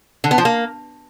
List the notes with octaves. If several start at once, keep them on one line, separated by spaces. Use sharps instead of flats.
D3
B3
F3
A#3